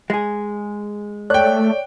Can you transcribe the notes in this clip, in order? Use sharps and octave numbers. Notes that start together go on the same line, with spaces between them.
G#3 G#4
A3 C#5 D5 G5 F#6